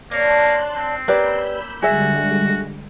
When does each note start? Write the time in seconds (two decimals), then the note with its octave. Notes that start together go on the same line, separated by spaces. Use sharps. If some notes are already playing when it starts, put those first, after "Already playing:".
0.11 A#3 D4 C#5 A5 C6 F#6
0.75 C4
1.08 A#3 C#4 G4 B4 D5 B5 E6 G6
1.82 D3 G3 G#3 F#4 G#4 E5